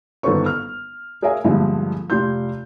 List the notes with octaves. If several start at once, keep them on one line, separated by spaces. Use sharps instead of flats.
G1 D#3 A4 B4 C5 C#6
F6
G#4 A#4 C#5 E5 F5 G#5
A#1 G2 D3 F3 G#3 A3
F1 F4 G4 C6 G6